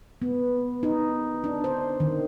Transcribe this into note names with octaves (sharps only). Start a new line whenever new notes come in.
B3
D#4
D4
C5
D#3